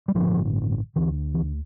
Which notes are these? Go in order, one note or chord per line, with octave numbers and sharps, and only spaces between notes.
G3
A1 G2 D3 F3
D2 D3 E3
E3